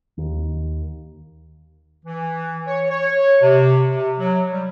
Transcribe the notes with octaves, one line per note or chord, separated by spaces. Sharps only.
D#2
E3
C#5
C#5
C3
C3
F#3
G3